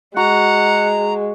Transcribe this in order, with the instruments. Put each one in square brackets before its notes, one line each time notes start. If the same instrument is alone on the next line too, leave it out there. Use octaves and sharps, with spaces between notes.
[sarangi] G#3 [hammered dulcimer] F#4 [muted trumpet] F#5 [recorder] A#5